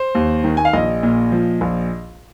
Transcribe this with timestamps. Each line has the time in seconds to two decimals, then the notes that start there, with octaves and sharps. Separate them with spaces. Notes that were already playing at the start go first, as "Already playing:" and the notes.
Already playing: C5
0.15 D#2
0.44 D#3
0.57 G#5
0.65 F5
0.73 A#1 D#5
1.03 A#2
1.32 F3
1.61 A#1